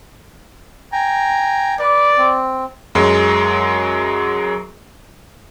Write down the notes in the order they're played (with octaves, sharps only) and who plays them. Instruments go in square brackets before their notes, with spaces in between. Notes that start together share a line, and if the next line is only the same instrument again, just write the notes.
[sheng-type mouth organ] G5 G#5 A#5
[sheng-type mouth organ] B4 [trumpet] D5
[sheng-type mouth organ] C4
[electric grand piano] F#2 F#3 G#3